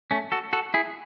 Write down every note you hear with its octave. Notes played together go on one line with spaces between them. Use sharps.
A3 C#4
F#4 A4
F#4 A4
E4 G#4